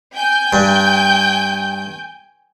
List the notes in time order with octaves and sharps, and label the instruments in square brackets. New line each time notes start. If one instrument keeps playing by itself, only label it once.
[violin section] G5 G#5 G6
[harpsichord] G2